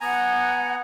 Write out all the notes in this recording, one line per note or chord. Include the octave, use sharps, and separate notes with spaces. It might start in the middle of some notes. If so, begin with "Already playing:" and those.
B3 F#5 G#5 A#5